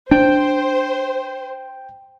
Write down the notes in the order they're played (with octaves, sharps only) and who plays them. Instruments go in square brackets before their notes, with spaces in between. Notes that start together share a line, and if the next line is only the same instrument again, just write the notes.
[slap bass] D4 [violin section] C5 [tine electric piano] G5